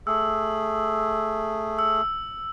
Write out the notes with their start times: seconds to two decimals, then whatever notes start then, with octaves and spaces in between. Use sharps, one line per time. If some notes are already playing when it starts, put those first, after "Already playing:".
0.07 A3 G#4 E6
1.79 E6